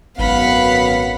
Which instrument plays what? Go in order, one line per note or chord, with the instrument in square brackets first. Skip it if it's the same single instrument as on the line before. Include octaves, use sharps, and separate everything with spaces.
[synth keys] G#1 [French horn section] F#2 B3 [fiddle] F5 [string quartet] F#5 B5